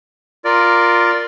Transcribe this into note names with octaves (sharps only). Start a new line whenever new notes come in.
F4 A#4 D5